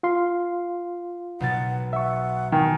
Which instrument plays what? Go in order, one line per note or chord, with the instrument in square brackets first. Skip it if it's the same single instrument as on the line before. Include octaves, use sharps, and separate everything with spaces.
[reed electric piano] F4 F5 C6
[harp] B1 B2 A6 [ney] F#5
[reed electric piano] E5 C#6 [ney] F#5
[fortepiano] D#3 [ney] G#5